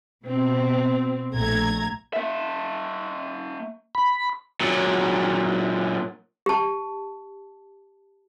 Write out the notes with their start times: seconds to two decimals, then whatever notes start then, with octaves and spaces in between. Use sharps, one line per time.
0.24 B2 C4
1.32 A#1 A3 A#5 G#6
2.13 A#3 E5
3.95 B5
4.61 A#2 F#3
6.46 G4 A5